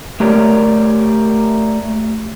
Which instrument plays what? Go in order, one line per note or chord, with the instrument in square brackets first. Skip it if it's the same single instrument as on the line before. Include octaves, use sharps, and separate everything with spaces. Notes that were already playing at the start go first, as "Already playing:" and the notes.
[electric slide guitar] A3 G4 A#4 C#5 D5